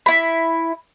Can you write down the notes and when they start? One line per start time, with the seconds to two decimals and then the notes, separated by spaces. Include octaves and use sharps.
0.06 E4 B5